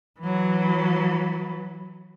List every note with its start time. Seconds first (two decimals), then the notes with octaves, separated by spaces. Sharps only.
0.20 E3 F#3